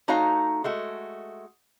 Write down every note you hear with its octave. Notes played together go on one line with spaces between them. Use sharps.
A3 D#4 F#4 C#5 F5 A#5
G#3 A3 F#4